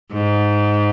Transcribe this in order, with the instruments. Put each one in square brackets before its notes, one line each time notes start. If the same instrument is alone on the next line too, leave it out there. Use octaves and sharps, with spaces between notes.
[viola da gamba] G#2